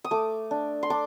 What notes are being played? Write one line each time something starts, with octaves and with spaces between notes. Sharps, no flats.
D#6
A3 D6
D4
C6
D4 D6